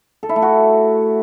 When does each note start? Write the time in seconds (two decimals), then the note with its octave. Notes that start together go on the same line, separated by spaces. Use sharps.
0.23 A4
0.29 E4
0.36 A3
0.42 F#4